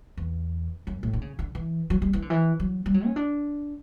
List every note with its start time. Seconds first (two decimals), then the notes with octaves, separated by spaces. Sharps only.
0.17 E2
0.87 F#2
1.03 A2
1.13 D3
1.21 C#3
1.39 D3
1.55 E3
1.90 F#3
2.02 G3
2.13 E3
2.22 D3
2.30 E3
2.60 F#3
2.86 G3
2.94 F#3
3.06 C#4
3.16 D4